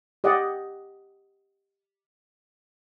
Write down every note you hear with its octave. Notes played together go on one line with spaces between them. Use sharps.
G4 D5 D#5 F#5